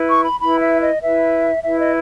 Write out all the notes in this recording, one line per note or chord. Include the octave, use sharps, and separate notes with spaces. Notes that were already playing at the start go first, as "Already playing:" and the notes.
Already playing: E4 B4
C#6
B5
E4 B4 B5
E5
D#5
E4 B4 E5
E4 B4 E5
D#5